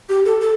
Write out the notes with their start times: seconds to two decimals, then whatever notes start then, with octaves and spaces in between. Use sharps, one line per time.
0.09 G4
0.25 A4
0.41 A4